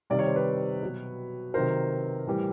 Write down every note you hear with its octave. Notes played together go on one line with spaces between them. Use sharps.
C3 D#3 G3 D5
C#5
C5
B4 C#5
B2 F#3
C3 D#3 F#3 A#4 C5
A2 E3 G3